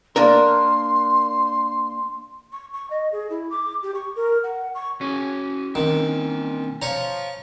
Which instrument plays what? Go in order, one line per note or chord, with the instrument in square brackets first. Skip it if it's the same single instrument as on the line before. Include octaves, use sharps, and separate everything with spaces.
[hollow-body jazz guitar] A#3 D4 A#4 [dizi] C6
[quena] C#6
C#6
D#5
G#4
E4
D6
G4
C#6
A#4
F#5
C#6
[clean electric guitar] C#4 [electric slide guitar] F#4 G#4
[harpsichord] D#3 [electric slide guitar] C4 D4
[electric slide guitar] C5 F5 [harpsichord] C#5 A#5